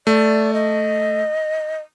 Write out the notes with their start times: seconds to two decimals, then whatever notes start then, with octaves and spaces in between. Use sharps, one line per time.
0.07 A3 D5
0.54 D#5